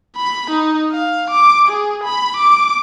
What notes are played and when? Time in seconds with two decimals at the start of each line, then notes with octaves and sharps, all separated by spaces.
0.16 B5
0.51 D#4
0.91 F5
1.30 D6
1.68 G#4
2.04 B5
2.37 D6